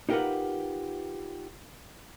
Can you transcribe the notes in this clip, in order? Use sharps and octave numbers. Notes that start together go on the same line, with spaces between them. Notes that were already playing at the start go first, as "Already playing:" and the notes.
D#4 F4 G4 A#4 B4 F#5